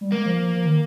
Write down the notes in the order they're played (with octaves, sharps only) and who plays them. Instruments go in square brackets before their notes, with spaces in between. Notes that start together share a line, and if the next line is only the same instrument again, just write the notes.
[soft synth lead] G3
[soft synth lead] G#3 [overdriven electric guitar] A#3
[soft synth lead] F3
F3
F3
D#3